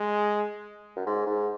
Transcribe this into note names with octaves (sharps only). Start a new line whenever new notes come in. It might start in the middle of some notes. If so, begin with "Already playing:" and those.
Already playing: G#3
F#2
G#2
G#2